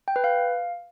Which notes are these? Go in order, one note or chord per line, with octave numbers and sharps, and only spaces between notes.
G5
B4
F5